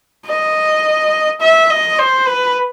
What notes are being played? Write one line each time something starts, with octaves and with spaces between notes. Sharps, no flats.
D#5
E5
D#5
C5
B4